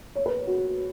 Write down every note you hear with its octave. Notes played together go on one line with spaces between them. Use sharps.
C#5
B4
F#4